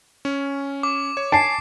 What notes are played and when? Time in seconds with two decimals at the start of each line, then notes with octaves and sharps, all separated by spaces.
0.25 C#4
0.83 D6
1.17 C#5
1.32 G#5 A5 C7 D7